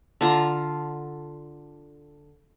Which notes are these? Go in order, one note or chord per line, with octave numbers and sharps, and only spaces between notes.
D3 F4 A#5